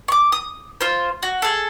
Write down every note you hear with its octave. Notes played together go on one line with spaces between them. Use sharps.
C#6 D6
D#6
F4 C5
F#4
G#4 A4